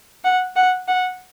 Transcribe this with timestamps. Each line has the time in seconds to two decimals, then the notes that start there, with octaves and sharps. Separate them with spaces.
0.24 F#5
0.56 F#5
0.88 F#5